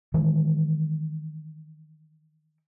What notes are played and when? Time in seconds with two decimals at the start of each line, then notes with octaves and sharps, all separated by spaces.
0.14 D#3 E3 G#3